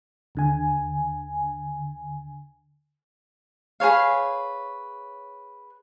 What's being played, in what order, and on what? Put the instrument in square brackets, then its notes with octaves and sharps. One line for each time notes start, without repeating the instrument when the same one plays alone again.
[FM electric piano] D#2 D3 G#5
[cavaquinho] G#4 B4 C#5 F5